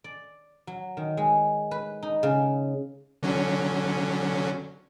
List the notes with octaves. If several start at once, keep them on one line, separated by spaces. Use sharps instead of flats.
D5
F#3
D#3
G#3
B4
D#4
C#3
D3 F#3 C#4